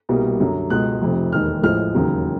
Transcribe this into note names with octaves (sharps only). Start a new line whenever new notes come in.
C2 B2 G3 A#3
F#2 D3 F#3
C#2 B2 G#3 F#6
F1 F2 C3
E1 D#2 D#3 G#3 F6
A1 A2 F3 G#3 F6
E1 D#2 C#3 F#3